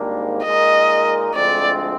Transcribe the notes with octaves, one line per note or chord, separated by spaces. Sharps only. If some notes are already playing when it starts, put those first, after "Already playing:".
Already playing: G#1 G#2 G3 A#3 D4
A#2 G#3 D#4 A#4 D#5
D2 D3 F3 G#3 C4 D5